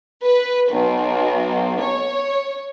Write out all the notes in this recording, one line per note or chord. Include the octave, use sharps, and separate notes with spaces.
B4
B1
C#5